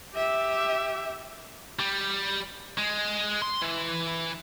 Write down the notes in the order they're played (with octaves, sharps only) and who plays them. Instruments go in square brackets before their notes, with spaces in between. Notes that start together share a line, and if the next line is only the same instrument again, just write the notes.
[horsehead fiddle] G4 E5
[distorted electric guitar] G3
G#3
C6
E3